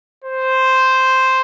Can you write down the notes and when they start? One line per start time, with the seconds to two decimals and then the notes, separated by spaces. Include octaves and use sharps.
0.24 C5